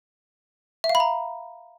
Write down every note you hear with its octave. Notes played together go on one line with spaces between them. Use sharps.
E5
F5
B5
A#5